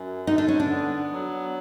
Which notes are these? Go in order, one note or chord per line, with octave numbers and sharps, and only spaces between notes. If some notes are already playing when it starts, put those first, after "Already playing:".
Already playing: F#2
D3 D#4
D4
C#4
D4
B3
F#3